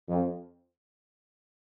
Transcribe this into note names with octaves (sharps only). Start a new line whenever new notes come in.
F2